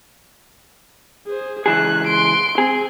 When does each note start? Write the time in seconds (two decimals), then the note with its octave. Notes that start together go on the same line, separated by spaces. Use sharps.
1.27 G#4 C5
1.66 C#2 E3 G#4 F#6
2.07 C6 D7
2.58 C4 G#4